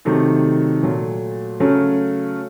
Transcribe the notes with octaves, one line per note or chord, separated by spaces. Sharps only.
C3 D#3 F#3 A3
A#2 F#3 A3
C#3 F#3 A3 C#4